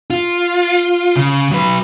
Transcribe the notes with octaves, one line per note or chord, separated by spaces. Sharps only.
F4
C#3
F#3 B4